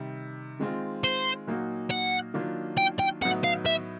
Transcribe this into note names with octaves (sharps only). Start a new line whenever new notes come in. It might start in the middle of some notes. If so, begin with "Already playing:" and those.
Already playing: C3 D#3 G3
D#3 G#3 C4 F4
C5
A#2 F#3 A#3 D#4 F#4
F#5
D#3 F#3 A#3 D4 F4
G5
G5
A2 F#3 B3 D#4 F#5
F5
E5